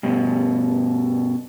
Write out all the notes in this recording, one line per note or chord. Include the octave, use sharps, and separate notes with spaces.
G2 B2